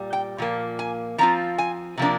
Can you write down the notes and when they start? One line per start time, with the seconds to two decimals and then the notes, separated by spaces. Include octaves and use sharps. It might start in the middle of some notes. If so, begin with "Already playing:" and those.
Already playing: A#2 G3
0.13 G5
0.38 A#2 F3 A#3
0.79 G#5
1.18 F3 C4 F4 A#5
1.58 G#5
1.98 C3 F3 A#3 D4